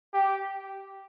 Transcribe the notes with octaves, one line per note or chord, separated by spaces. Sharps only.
G4